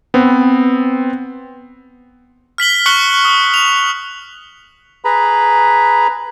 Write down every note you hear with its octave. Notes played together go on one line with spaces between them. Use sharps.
B3 C4
F6 B6 F#7 G7
C#6 F#6 C#7 F#7 G7
D#6
F7
G#4 B4 A#5 B5